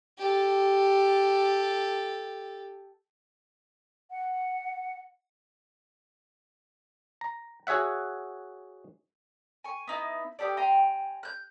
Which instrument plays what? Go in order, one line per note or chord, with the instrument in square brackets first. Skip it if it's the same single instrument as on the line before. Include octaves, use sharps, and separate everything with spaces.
[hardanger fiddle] G4 A4
[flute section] F#5
[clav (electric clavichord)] A#5
F#4 G#4 C#5 E5 F#5
[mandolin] G#5 C#6
B3 D#4 E4
B3 G4 A4 D5
G5 G#5 A#5 C6
F#6 G6